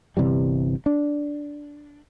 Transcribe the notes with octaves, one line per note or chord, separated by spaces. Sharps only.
G1 C3 E3 G3
D4